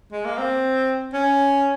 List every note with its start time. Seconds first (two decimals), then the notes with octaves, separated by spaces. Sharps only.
0.12 G#3
0.25 A#3
0.38 C4
1.14 C#4